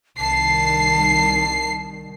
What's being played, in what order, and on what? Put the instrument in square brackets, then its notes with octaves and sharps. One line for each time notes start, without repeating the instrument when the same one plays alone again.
[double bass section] C2 D#3 G3 [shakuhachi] A5 [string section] C7